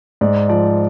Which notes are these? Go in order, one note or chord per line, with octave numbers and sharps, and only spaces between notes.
G#2 D5
F3 D5